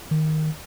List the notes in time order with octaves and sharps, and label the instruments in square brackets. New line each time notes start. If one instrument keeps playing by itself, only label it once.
[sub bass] D#3